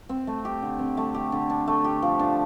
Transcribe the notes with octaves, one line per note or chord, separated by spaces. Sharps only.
C4
A3
G4
D3
C4
A3
G4
D3
D4
A3
G4
F3
D4